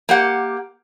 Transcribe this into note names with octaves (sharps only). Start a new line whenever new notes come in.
A#3 G4 F#5